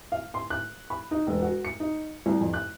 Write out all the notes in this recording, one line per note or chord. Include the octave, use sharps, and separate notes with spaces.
F5
C6
F#6
B5
D#4
E1
F#4
C#7
D#4
C2
F2
F#6